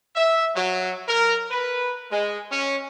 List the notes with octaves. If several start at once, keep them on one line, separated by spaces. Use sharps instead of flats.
E5
F#3
A#4
B4
G#3
C#4